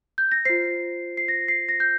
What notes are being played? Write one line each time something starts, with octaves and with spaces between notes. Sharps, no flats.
G6
A#6
F4 C5 C7
C7
A#6
C7
A#6
G6